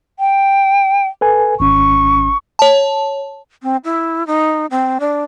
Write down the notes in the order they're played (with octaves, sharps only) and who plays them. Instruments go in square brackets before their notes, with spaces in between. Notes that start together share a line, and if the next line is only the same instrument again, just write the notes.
[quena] G5
[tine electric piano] A4 B4 G#5
[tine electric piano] G#1 C#4 [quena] C#6
[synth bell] C#5 A5
[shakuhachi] C4
E4
D#4
C4
D4